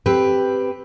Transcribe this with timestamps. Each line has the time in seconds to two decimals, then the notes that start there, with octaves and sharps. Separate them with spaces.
0.06 C4 G4 B4